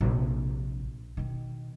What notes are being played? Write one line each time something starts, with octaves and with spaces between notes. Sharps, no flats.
A#1 C3
B2 D#3